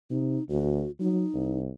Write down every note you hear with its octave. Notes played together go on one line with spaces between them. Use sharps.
C3 D#4
D2 F#4
F#3 D#4
C2